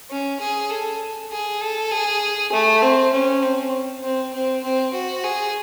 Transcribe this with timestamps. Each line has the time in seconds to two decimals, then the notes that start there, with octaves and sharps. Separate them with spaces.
0.10 C#4
0.41 G#4
0.70 A4
1.31 G#4
1.61 A4
1.91 G#4
2.52 A3
2.82 C4
3.12 C#4
3.42 C4
4.03 C4
4.33 C4
4.64 C4
4.93 F#4
5.24 G#4